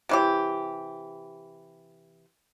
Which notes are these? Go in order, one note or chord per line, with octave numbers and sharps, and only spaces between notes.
C3 E3 G4